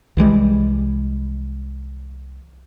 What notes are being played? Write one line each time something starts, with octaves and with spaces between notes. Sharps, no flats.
C2 E3 G3 G#3